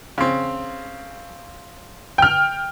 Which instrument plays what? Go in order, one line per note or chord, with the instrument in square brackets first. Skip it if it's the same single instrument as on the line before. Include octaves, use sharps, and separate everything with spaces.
[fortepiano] C#3 C4
[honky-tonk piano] G5 F6